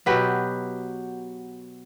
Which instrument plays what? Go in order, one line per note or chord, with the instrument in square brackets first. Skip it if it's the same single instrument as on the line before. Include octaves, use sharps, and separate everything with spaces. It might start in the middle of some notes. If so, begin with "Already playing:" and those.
[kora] B2 F#3 G4 B4